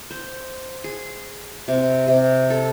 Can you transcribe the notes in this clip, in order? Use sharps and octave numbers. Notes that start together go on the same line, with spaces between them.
C5
G#4
C3
C3
A4